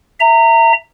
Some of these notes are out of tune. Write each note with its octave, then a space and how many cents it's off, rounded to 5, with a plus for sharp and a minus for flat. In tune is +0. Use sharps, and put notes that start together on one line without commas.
E5 +0 A#5 -25